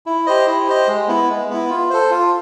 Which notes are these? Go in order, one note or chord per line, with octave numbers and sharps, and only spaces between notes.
E4
G4 C5 D#5
E4
G4 C5 D#5
G#3
B3 E4
G#3
B3 E4
F4
A4 C5
F4